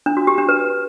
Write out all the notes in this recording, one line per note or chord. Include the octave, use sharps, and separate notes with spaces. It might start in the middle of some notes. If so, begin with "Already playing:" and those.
D4
F#4
G4
D4
B4